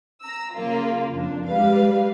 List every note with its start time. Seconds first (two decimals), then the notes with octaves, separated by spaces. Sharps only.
0.22 A#5 E6
0.54 C#3 F#3 A#3 F4
1.12 F2 D4
1.47 G3 G#3 B4 F5